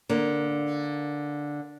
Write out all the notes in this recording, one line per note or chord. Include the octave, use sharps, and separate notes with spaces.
D3 A#3